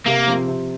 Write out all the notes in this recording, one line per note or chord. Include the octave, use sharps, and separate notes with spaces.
C3 A#3
F3 C4 G4
C3